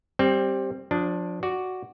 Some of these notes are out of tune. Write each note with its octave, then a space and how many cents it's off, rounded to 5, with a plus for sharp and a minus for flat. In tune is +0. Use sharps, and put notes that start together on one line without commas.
G3 +0 C4 +15
F3 +30 D4 +0
F#4 +0 D5 +0